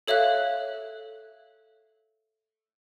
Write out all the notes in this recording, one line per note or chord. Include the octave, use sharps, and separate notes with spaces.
A4 C#5 E5 F5 F#6